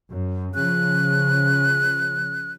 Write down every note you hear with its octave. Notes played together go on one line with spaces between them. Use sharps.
F#2
C#3 F3 F#6